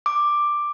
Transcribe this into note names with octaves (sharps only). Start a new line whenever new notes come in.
D6